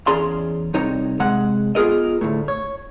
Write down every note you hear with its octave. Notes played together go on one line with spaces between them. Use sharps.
E2 C#4 G#4 D5 A#5 C6
C2 C3 D#4 C#5 A#5
C3 G#3 F#5
B3 F4 G#4 A#4 D#5
D2 A2
C#5